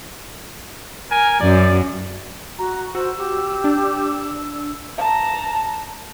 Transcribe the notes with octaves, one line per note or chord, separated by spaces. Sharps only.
A#4 G#5
F#2 D5
F#4 A#5
F#4 C5 E6
G4
D4
A5 A#5